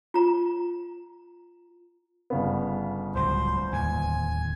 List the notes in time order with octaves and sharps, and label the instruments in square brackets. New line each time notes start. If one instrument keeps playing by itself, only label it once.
[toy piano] F4 A#5
[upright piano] G1 C#3 B3
[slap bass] D1 C#2 F#3 [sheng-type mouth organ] C5
[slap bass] D1 D#2 [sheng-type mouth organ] G#5